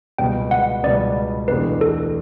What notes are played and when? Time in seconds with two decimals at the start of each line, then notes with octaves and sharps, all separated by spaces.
0.18 C#2 B2 G3 B3 G5
0.51 F#5
0.83 C#2 B2 G3 B3 D5
1.48 E2 B2 A3 D4 G4 B4
1.81 A4